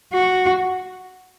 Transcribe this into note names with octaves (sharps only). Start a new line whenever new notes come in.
F#4